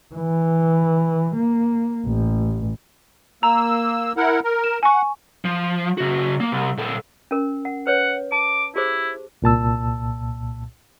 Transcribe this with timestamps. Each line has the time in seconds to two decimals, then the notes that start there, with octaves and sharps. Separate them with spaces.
0.15 E3
1.36 A#3
2.07 A1
3.43 A#3 A#5 E6
4.17 E4 A#4 F#5
4.44 A#4
4.64 E7
4.83 F#5 G#5 C#6
5.45 F3
5.98 C#3 F#4
6.40 A#3
6.52 C2
6.78 A#2 A4
7.31 C#4 A#4
7.65 F#5
7.87 B4 C#5 F#5
8.32 A5 D6
8.76 E4 G4 G#4 C5
9.42 C2 A#2 A5 E6